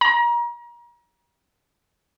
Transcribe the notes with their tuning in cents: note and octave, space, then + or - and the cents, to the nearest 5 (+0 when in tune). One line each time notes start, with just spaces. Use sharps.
A#5 +35